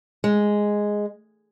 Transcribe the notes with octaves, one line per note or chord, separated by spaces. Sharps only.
G#3